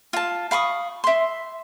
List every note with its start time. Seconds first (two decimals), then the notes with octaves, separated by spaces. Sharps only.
0.13 F4 A5
0.51 F5 B5 C#6 D#6
1.04 E5 C6